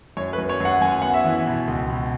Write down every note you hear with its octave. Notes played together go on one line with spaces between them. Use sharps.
F#2 C#5
B4
F#2
C#5
F#2 F#5
F#2 G#5
B3 F#5
E5
E3
B2
C#2
B2